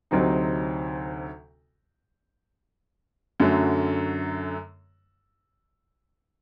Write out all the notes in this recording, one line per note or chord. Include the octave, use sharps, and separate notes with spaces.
D2 C3 F#3 C4 D#4
F#2 D3 F#3 A3